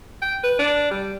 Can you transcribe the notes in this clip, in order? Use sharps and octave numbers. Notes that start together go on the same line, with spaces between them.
G5
B4
D4
G3